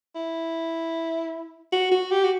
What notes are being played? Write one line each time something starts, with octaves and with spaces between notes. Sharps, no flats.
E4
F#4
F#4
G4
F#4